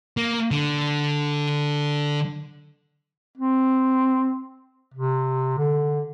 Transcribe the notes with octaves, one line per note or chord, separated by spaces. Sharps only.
A#3
D3
C4
C3
D3